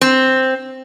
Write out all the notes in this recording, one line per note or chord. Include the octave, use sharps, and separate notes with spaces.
C4